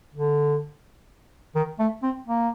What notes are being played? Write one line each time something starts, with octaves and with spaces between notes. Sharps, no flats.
D3
D#3
A3
C4
A#3